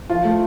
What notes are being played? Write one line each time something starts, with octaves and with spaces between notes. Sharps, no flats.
F3 F4
A3